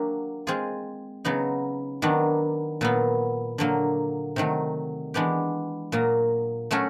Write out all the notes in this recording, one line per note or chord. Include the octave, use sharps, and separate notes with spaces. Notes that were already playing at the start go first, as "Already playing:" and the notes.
Already playing: F#3 A#3 D4 G4
G#3 C4 F4 G#4
C#3 F#3 B3 D#4
D#3 F#3 B3 D4
A#2 F#3 B3
D3 F#3 A#3
C3 D#3 F#3 A3
E3 G#3 B3 D4 G4
A#2 F#3 A#3
F#3 A3 C#4 F#4